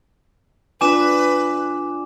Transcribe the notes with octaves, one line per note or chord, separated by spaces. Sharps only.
D4 F4 B4 D5 G#5 D6 E7